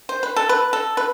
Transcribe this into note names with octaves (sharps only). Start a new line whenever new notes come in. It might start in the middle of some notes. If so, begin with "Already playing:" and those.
C5
B4
A4
B4
A4
B4